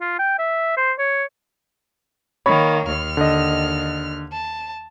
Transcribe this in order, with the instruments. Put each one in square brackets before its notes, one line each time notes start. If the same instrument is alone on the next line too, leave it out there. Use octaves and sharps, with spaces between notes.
[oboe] F4
G5
E5
C5
C#5
[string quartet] D#3 A#3 [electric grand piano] C#5 B5 C#6
[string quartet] D#2 F6
[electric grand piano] D3 D#5
[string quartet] A5